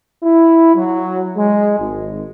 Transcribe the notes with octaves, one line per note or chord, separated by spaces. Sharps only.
E4
F#3
G#3
G#1